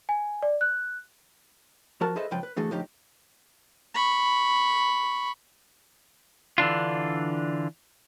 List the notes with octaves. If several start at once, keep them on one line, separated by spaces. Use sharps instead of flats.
G#5
D5
F#6
F3 F#4 A#4 A5
G#4 A4 B4 C5 D#5 E5
C#2 F#2 F3 B4 G5
B4
D3 E3 A3 F#4 G#4 A4
A2 D3 F3 D#4 G4
B5 C#6
D3 E3 D4 F4